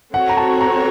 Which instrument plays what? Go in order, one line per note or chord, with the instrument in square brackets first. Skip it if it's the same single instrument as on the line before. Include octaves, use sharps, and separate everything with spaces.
[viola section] C4 F#4 A4 C#5 [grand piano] F#5
[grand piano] A#5
A5
A#5